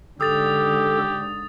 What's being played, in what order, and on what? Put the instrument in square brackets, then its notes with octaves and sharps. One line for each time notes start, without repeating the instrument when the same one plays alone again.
[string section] G#2 D3 [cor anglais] G4 [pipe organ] A4 [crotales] D#6 A6 F7